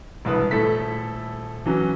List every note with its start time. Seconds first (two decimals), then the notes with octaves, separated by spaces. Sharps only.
0.25 E1 C2 B4 D#6
0.51 D#1 A3 E4 A4 B6
1.66 E3 F#3 C#4